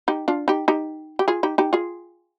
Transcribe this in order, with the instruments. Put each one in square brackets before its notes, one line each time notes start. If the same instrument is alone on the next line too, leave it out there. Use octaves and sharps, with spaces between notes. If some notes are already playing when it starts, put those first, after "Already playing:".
[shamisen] D#4 G4
D4 F4
D#4 G4
D#4 G4
G4
F4 G#4
D#4 G4
D#4 G4
F4 G#4